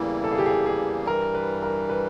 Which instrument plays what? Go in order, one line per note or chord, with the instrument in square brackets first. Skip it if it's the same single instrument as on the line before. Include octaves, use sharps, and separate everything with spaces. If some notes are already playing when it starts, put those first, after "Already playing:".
Already playing: [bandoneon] E2 C#3 E3 G3 A#3 [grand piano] E4
[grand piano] A4
G#4
G4
G#4
G#4
[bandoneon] G2 E3 G3 [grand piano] A#4
[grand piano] B4
A#4
B4